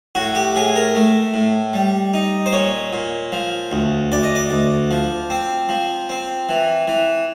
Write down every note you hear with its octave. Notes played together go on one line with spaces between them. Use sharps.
A2 F#4
G4
A2 G#4
A#4
A3
A2
G3
D#4
C5
A#2 C#5
A#2
F3
D2
D2 D5
D#5
D5
D2
F3
C4
F3
C4
E3
E3